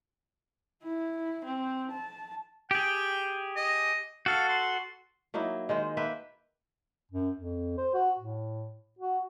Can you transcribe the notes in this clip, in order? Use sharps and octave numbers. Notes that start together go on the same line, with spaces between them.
E4
C4
A5
G4 G#4 G5
D#5
F#4 A4 F5
C6
F#3 A#3 D#4 E4
D#3 G#3 C5
A#3 B4 E5 G5
F#2
F2
C5
F#4
A2
F#4